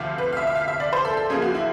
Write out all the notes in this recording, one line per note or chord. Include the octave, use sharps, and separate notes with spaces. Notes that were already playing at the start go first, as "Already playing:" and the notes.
Already playing: D2 C3 F3 A3 F5
B4
F5
E5
E5
F5
E5
D5
C5
A4
A4
F#2 C#3 F3 A#3 G#4
F#4
E4